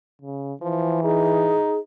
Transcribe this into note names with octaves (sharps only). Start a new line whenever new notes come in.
C#3
E3 F3
D#4 G#4